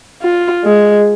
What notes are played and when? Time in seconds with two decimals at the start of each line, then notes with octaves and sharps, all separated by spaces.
0.22 F4
0.64 G#3